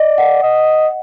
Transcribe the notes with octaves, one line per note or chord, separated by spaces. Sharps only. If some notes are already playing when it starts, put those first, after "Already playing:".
Already playing: D5 D#5
F#5
D#5